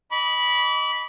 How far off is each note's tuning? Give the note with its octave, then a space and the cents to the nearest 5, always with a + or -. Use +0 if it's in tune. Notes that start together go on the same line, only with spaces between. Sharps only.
D#5 +0 B5 -10 D6 -45